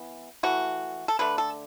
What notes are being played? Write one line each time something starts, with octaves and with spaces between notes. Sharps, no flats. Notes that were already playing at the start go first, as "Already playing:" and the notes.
Already playing: E3 B3
E3 A3 F#4
A4
D3 A3 B4
A4